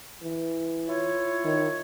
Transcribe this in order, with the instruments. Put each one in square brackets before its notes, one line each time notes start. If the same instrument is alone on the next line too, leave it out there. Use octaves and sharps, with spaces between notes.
[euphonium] E3
[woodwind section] E4 F4 C#5
[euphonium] D#3